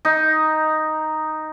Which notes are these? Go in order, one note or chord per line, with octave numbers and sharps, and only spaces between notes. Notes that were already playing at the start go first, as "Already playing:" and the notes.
D#4